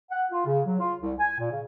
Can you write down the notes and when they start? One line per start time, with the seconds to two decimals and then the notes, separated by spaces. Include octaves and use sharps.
0.11 F#5
0.31 F4
0.46 C#3
0.65 F#3
0.79 F4
1.00 C2
1.19 G#5
1.39 A#2
1.51 C#3